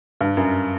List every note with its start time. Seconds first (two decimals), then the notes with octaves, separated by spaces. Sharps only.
0.21 G2
0.37 F#2